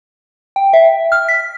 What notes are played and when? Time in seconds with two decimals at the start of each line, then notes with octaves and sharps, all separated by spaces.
0.56 G5
0.73 E5
1.12 F6
1.28 B6